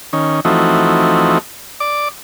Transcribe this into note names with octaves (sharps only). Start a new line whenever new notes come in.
D#3 C#4
E3 F3 A3 C4 D#4 F#4
D5 D6